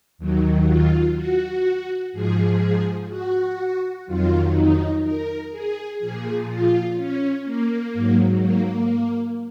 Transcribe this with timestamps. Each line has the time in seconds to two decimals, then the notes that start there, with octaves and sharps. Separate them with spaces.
0.18 D#2 D#3 F#3
0.67 F4
1.16 F#4
2.13 G#2 F3 G#4
3.09 F#4
4.06 F2 D#3 F#3 F4
4.54 D#4
5.03 A#4
5.51 G#4
5.99 A#2 F3 G#4
6.48 F4
6.96 C#4
7.45 A#3
7.94 G#2 F#3
8.41 A#3